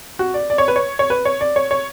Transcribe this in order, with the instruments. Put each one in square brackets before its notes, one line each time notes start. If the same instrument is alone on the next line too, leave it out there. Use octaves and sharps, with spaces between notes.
[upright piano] F#4
D5
D5
C#5
B4
C#5
C#5
B4
C#5
D5
C#5
C#5